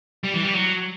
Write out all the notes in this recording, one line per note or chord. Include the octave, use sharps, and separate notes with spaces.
G3
E3
G3
F#3